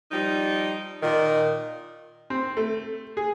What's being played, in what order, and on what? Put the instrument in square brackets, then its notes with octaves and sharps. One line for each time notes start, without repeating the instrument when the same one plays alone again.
[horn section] F3 G3 D#4
A#2 D#3
[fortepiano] C4
A3
G#4